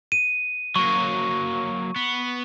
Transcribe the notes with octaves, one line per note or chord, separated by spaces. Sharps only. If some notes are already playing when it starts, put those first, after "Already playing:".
D#7
F#3 A#3 C#6
B3